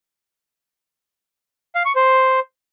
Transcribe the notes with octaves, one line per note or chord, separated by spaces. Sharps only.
F5
C#6
C5